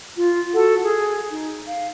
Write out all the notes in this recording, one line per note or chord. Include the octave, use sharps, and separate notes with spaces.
F4
F#4 A4 F#5
G#4
D#4
F5